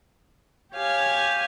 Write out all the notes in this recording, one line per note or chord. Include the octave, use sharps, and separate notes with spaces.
G4 C#5 F5 G#5